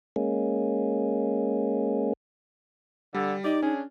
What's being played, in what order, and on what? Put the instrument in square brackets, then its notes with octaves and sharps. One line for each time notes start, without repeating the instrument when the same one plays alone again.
[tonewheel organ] G#3 A#3 C#4
[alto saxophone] D3 [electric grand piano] G3
[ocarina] D#4 [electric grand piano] G4 D#5 [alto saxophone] D5
[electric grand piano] C#4 D4 [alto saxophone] G#4